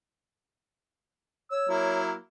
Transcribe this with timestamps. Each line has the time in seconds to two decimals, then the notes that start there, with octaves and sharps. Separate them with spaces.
1.51 C#5 E6
1.69 F#3 A#3 E4